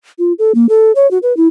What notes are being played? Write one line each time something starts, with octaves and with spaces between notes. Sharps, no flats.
F4
A4
A#3
A4
C#5
F#4
B4
E4